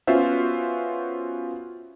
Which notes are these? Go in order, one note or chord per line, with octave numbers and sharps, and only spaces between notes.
B3 C#4 F4 F#4 C5 E5